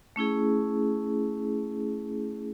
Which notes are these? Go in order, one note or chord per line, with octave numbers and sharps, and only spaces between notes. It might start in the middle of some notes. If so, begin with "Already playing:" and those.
A3 C#4 E4 G#4